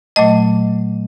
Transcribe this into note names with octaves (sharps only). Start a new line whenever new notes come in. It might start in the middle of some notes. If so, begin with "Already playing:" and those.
A#2 F#3 A3 D#5